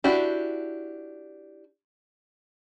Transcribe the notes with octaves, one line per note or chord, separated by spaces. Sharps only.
D4 E4 F#4 G4